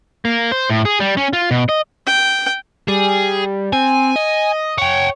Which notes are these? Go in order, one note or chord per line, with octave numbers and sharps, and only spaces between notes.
A#3
C5
A2
G#4
G3
C#4
F4
B2
D#5
G5
G3 G#4
C4 G#5
D#5
C#5 F#5 G5